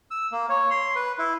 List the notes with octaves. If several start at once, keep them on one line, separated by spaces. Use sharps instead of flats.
E6
A#3
C#5
C6
B4
E4